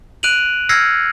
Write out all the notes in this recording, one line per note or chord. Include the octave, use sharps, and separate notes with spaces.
F#6 D7 D#7 F7 F#7
E6 F6 G#6 A#6 C7 C#7